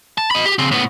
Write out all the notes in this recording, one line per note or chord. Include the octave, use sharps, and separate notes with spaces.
A5
D#5 B5
G4
C#3 C4
A2 B3